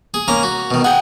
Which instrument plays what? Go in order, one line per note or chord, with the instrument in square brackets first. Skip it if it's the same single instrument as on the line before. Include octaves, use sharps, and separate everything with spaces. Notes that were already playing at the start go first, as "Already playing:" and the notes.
[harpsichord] G#4
A#3 C#4 A#5
F#4
B2 D#3
[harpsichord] G#4 [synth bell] F#5 G5